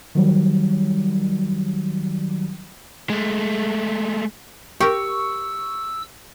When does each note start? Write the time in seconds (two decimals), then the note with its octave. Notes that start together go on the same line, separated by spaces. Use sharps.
0.15 D#3 F#3 G3
3.10 G#3 A3
4.80 G4 A#4 C#6 E6